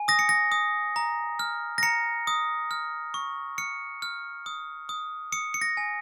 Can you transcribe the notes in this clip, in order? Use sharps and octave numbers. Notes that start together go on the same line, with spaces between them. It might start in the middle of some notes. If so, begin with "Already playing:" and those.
Already playing: G#5
D#6 A#6
C#7
A#6
D#6
A#5
F6
A#6
A#5 C#7
D#6
F6
C#6
F6 C#7
F6
D#6
D#6
D#6 C#7
C#7
A#6
G#5